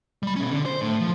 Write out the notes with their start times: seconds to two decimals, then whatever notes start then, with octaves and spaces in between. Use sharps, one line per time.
0.23 G3 B5
0.36 B2 C#4
0.52 D3
0.65 C5
0.81 A2
1.00 F3